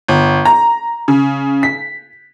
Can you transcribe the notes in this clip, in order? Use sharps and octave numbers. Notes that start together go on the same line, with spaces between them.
G1
A#5
C#3
B6